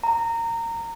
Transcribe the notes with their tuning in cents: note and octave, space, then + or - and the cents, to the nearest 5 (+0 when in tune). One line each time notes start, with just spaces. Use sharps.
A#5 -20